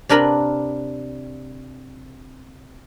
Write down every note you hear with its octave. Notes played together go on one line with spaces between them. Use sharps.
C3 D4 A#4 B4 B5